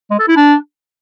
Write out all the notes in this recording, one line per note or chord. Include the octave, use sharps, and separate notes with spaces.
G#3
A4
E4
D4